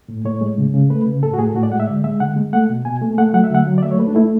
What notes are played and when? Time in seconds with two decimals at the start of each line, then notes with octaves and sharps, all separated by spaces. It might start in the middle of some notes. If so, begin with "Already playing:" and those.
0.08 A2
0.25 A2 C#5
0.41 G#3
0.58 C#3
0.74 C#3
0.90 A3 B4
1.07 C#3
1.23 A2 A4
1.33 F#4
1.38 A2 G#4
1.47 A4
1.55 A2 F#4
1.63 D5
1.71 G#3 F#5
1.80 E5
1.87 D3 D5
2.04 G#3 E5
2.20 D3 F#5
2.36 G#3
2.53 A3 F#5
2.69 B2
2.85 B2 G#5
3.02 A3
3.18 A3 F#5
3.33 F#3 F#5
3.44 E5
3.50 D3 F#5
3.67 F#3
3.78 D5
3.83 A3 E5
3.91 C#5
3.99 A3 B4
4.07 D4
4.15 A3 E4